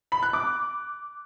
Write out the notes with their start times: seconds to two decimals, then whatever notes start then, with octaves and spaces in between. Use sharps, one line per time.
0.12 B5
0.23 F#6
0.33 D6